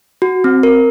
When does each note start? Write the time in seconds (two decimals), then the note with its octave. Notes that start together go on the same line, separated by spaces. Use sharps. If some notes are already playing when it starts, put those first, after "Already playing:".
0.22 F#4
0.44 C4
0.63 A#4